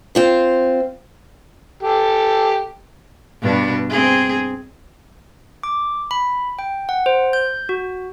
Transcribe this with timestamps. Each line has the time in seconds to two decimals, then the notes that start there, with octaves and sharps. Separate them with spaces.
0.15 C4 F4 C5
1.83 G4 A4
3.42 G2 B2 D4
3.90 C4 G#4
5.63 D6
6.11 B5
6.59 G5
6.89 F#5
7.06 C5
7.33 G6
7.69 F#4